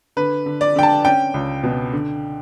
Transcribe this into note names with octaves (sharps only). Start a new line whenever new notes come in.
D3 B4
D3
D5
D3 G5
A5
C#4 G5
C#2
B2
D3